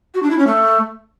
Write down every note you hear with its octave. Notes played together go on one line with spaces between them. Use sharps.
F#4
D4
E4
C#4
A3